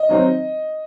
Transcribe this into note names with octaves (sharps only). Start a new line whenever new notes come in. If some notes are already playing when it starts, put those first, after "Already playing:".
Already playing: D#5
D#3 F#3 C4 D#4